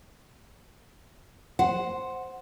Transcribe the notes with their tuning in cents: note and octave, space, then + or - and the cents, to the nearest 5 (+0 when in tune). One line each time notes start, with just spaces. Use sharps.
C5 +0 F#5 +0